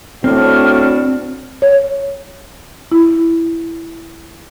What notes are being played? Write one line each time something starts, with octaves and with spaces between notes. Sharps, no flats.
A2 C4 D4 F#4 F6
C#5
E4